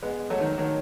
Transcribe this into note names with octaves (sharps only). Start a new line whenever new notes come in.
G#3 B3
F#3 A3
D#3
D#3 F#3